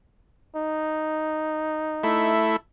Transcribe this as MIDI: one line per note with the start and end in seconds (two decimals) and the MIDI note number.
0.56 2.35 63
2.04 2.56 57
2.04 2.56 64